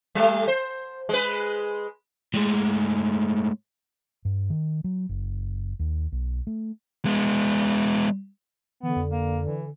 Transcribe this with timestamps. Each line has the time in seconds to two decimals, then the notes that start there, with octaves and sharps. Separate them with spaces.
0.15 G3 A3
0.48 C5
1.09 G#3 B4
2.34 A2 G#3
4.25 G2
4.50 D#3
4.84 F#3
5.09 F#1
5.79 D#2
6.12 B1
6.47 A3
7.05 G#3 B3
8.83 D3 E3 B3
8.96 F2
9.12 A#3
9.44 E3